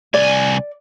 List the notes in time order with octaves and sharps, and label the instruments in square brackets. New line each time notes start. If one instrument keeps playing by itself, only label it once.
[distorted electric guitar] C2 G#5 [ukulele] D5